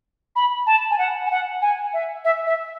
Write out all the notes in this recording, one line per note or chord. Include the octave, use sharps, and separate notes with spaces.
B5
A5
G#5
F#5
G#5
F#5
G#5
E5
E5
E5